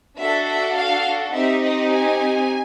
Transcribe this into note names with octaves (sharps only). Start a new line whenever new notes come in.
D4 F#4 A4 E5
E5
F5
C4 D#4 G4 E5
D#5
G#5